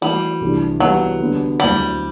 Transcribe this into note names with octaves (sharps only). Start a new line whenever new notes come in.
E3 G3 A3 C4 F#4
C2 C3 E3 A3 D4
E3 F#3 G3 B3 F#4 B4
D3 G3 B3 F#4
D2 D3 F#3 G3 C4 E4